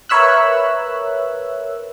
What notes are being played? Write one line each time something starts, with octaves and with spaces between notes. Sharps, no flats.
A#4 B4 C#5 E5 E6 F#6